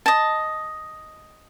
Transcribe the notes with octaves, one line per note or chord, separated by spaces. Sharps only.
D#5 A5